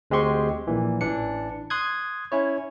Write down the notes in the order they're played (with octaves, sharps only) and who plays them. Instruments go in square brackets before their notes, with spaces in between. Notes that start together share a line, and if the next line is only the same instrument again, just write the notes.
[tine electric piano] D2 G#3 C4 G4 C6 C#6
A#1 A#2 E3
A1 E3 D4 C#7
C6 D#6 F#6 G#6
C#4 E4 C#5